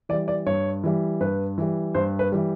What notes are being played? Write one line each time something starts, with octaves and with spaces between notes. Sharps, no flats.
E3 G3 D5
D5
G2 C#5
E3 G3
G2 B4
E3 G3
G2 C5
B4
E3 G3